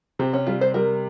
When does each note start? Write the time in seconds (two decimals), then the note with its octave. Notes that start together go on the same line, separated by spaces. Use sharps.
0.19 C3 C4
0.33 C#4
0.46 G3 F4
0.61 C5
0.74 G3 A#4